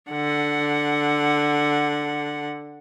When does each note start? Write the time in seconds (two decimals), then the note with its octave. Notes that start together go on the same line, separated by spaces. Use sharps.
0.11 D3 F#5